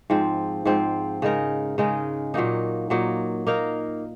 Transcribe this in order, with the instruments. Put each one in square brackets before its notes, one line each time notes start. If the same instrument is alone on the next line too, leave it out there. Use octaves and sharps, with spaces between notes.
[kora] G#2 F3 C4
G#2 F3 C4
C#3 G#3 D#4 A#4
C#3 G#3 D#4 A#4
A#2 F#3 A#3 D#4
A#2 F#3 A#3 D#4
A#3 D#4 A#4 F5